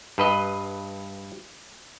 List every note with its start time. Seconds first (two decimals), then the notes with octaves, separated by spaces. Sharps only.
0.18 G2 B4 D#5